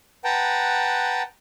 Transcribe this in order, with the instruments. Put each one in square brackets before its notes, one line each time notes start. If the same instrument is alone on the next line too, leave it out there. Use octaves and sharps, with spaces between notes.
[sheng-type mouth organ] B4 F#5 G5 A5 A#5